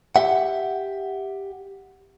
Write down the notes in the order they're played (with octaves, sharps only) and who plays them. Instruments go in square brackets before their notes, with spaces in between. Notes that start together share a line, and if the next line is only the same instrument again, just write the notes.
[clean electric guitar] G4 E5 F#5